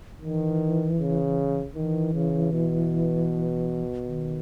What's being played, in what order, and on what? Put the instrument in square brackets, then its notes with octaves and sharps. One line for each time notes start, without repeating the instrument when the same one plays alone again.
[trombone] D#3 [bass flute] E3
[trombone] C#3
[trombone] D#3 [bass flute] E3
[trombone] C#3
B2
[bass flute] D#3